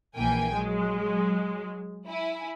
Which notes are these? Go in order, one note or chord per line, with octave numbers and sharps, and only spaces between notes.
A#1 E3 A#3 G5 G#5
F#3 G#3
E4 G#5